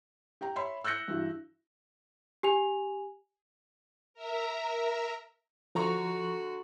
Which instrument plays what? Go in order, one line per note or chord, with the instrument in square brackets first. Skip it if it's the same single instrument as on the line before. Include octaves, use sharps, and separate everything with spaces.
[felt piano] G4 G5 A#5
C#5 E5 B5 C6
E6 F#6 G6 A#6 C#7
G2 E3 E4 F#4
[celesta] G4 G#5 F7
[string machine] A#4 E5 A#5
[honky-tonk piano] D3 A#5 C#6 [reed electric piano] F3 [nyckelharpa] F#4